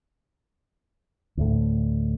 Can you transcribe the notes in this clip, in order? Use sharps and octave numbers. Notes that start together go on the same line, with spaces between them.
D2 A2